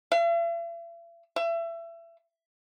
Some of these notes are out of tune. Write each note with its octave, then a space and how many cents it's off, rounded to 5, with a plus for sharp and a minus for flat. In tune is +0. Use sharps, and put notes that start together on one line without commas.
E5 +45
E5 +30